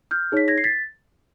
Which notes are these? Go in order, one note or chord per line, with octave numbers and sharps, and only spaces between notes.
F6 G6
D#4 G#4 C#5 B6
G#6 A#6
C7
A6 B6